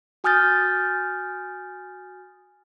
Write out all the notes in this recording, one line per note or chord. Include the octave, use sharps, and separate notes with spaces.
F#4 G#5 D#6 F6 G6 A6